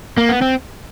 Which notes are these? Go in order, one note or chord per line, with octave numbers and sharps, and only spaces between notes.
A#3
B3
C4